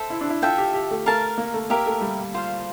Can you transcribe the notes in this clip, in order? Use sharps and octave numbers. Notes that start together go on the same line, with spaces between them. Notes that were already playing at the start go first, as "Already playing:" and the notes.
Already playing: A4 C5 E5
E4
D4
E4
F4 A4 E5 G5
G4
G4
A3
A3 A#4 F5 A5
A#3
A3
A#3 G4 A#4 E5
A3
G3
F4 C5 F5